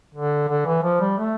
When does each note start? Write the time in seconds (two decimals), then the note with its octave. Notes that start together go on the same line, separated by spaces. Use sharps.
0.15 D3
0.48 D3
0.66 E3
0.83 F3
1.00 G3
1.18 A3